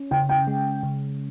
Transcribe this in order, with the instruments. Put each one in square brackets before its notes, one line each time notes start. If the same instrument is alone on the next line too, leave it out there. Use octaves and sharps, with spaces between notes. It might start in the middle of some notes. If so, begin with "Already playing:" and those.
Already playing: [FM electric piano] C#4
[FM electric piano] C#3 [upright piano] G5
[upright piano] G5
[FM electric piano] G#3
C#3